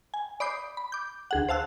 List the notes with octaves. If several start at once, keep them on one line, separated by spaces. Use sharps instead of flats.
G#5
D5 B5 D6 D#6 G6 C7
B5
D6 G6
D2 G#4 F#5
C5 F5 A5 E6 F#6